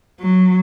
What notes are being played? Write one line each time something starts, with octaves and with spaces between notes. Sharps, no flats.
F#3